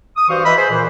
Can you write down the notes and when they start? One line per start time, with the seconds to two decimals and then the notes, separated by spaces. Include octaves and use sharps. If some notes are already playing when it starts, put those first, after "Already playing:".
0.16 D#6
0.29 G2 E3 F#4 C5 F5 C#6
0.45 E3 B4 D#5 E5 B5
0.57 G#4 C5
0.71 A#2 E3